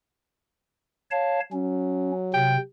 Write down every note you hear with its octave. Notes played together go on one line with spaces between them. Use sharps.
C#5 F5 A5
F#3 C#4
C3 G5